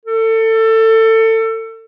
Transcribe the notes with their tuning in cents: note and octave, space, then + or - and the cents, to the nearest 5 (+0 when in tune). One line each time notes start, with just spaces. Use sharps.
A4 +25